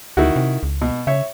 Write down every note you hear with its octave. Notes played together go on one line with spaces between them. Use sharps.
D2 D#3 E4 F#4
C3
C#2
B2
C#3 C#5 E5